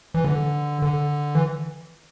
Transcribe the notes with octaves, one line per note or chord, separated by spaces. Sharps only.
E3
D3
D3
E3